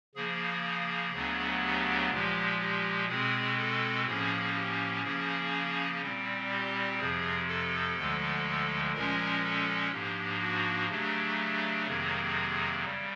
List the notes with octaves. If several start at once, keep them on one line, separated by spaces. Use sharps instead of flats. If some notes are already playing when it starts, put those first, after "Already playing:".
C#3 F3 A#3 G#4
D2 C#3 F#3 B3 D4
G4
A#2 F3 G#3 G4
G4
B2 G#3 C4 G#4
A4
A2 F3 A#3 C#4 G#4
G4
C#3 F3 A#3 C#4 G#4
A#2 G3 C4
G4
F2 C3 F3 G#4
A4
D2 D3 F3 G#3
A#2 F3 G#3 C#4 A#4
A4
G#2 F3 A#3 D4 G4
F#4
C#3 F#3 A3 D4 G4
G4
F2 C3 D#3 F#3 A#3 G#4
C#3 G3